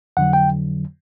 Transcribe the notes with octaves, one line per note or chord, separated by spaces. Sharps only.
F2 D3 F#3 F#5
G5